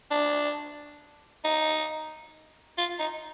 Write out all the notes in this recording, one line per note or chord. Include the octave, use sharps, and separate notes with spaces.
D4
D#4
F4
D#4